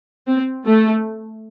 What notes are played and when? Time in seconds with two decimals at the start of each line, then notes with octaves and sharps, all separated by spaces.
0.27 C4
0.66 A3